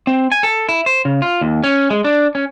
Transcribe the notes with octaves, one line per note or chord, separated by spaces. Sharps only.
C4
G#5
A4
E4
C5
C#3
F4
D#2
C#4
G#3
D4
C#4